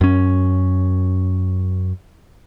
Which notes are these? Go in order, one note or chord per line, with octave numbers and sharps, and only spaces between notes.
F#2 C#4